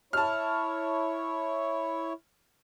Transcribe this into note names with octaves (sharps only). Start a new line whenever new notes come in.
E4 C#5 A5 F6